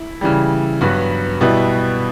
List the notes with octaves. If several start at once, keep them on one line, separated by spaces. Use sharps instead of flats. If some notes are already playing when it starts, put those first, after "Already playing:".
Already playing: E4
C#3 E3 G3
G2 F#3 B3 F#4
B2 G3 B3 E4